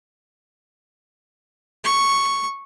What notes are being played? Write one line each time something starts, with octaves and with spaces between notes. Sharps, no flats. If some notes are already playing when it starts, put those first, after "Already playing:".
C#6